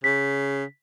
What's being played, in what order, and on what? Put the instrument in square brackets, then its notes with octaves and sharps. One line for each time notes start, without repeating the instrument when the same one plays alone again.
[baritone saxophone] C#3 [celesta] B6